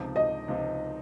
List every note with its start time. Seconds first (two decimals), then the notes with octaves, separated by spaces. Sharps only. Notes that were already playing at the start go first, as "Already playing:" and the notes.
Already playing: C#2 C3 F3 C4 D#4
0.16 D#5
0.48 C#2 C3 F3 C4 D#4